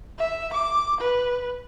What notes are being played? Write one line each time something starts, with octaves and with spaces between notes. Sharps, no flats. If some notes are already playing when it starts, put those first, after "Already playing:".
E5
D6
B4